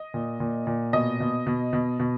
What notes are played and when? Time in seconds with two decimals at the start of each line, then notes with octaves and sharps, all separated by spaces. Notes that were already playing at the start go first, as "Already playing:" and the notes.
Already playing: D#5
0.14 A#2
0.40 A#2
0.67 A#2
0.93 B2 D#5
1.20 B2
1.46 B2
1.73 B2
2.00 B2